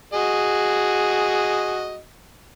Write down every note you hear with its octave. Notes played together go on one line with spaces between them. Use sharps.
F#4 G#4 D#5